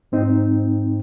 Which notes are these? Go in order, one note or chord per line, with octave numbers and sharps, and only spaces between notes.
G#2 C4 D#4